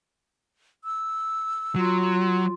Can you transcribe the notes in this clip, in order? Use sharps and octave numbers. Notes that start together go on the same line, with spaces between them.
E6
F#3 F4